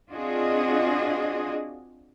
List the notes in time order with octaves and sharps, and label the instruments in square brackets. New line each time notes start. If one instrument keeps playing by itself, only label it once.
[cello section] C4 D4 F4 F#4 G#4 D#5